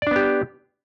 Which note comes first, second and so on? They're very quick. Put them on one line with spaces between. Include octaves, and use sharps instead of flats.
D5 D4 B3 G4